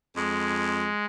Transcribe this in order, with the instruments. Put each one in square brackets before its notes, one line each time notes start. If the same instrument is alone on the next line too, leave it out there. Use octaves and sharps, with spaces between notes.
[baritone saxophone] F2 [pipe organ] G#3